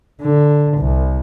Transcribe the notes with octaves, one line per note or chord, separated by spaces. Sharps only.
D3
C2